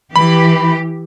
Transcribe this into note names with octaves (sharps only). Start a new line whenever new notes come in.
E3 G4 B5